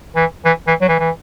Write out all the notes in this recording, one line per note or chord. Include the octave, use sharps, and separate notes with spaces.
E3
E3
E3
F#3
E3
E3